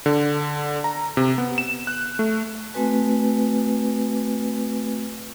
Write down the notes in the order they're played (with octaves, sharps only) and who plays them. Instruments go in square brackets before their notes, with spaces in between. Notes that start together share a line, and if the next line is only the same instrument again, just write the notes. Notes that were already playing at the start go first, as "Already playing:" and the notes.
[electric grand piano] D3
A#5
C3
B3
E7
F#6
A3
[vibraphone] A3 C4 F#4 B4 G#5